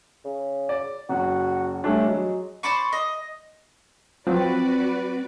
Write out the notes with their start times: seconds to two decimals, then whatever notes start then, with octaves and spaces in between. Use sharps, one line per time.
0.25 C#3
0.69 D5
1.09 F#1 F#4
1.84 G3 A3 C#4 D4
2.08 F#3 G#3
2.63 C5 D5 B5 C#6
2.93 D#5
4.27 F3 F#3 C4 F#4 B4 D5